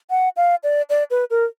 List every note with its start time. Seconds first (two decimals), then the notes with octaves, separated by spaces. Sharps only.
0.10 F#5
0.37 F5
0.63 D5
0.90 D5
1.11 B4
1.30 A#4